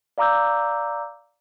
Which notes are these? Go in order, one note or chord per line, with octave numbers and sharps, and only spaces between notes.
D5 F5 A#5 D6 E6 G6